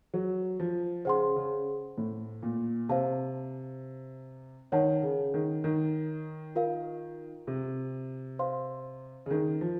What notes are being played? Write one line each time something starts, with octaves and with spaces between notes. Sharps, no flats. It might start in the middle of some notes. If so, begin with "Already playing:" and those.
F#3
F3
C#3 C5 F#5 C6
C#3
A2
A#2
C3 C5 F5 A5
D#3 C#5 F#5 A5
C#3
D#3
D#3
F4 A#4 F5
C3
C5 F5 C6
C#3
D#3
F3